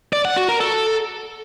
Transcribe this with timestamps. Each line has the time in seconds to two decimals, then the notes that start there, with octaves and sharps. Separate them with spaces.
0.13 D5
0.25 F#5
0.37 F#4
0.49 A#4
0.61 A4